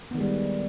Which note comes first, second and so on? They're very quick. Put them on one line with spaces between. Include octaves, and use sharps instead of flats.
B3 D#3 G#3 G3